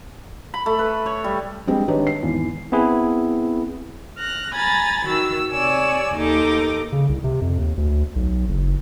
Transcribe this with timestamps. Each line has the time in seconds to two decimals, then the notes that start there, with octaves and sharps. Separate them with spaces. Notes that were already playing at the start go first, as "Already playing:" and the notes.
0.54 B5
0.66 A3
0.79 B4
1.06 C#5
1.24 G3
1.67 G3 G#3 C4 D4
1.88 D#3 D4 D#4 G4 B4 C#5
2.07 C7
2.23 G#1 E2
2.72 B3 C4 E4 G#4 B4
4.17 F6 F#6 A#6
4.54 G#5 A#5 B5 G#6 A6
5.06 D#3 F#4 E6
5.51 C3 C#5 D5 G#5 E6
6.15 D#2 D#4 A4 D6
6.92 C#3
7.09 C2
7.24 C3
7.41 F2
7.59 D#2
7.77 D2
8.16 B1
8.49 F#1